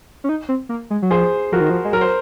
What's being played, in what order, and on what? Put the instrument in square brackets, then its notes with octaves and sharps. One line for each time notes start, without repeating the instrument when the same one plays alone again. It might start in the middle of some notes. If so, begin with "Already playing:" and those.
[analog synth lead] C#4
D#4
C4
A#3
G#3
F#3
[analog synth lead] F3 [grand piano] G#4 C5
[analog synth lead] F3 [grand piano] F#4 A#4
[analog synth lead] D#3
F3
G#3
[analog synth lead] F#3 [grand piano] A#4
[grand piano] C5